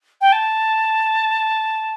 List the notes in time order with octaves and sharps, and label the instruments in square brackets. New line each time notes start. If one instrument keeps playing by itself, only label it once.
[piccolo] G5
A5